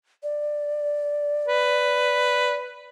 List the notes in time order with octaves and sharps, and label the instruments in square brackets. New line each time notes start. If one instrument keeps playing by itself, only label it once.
[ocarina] D5
[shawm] B4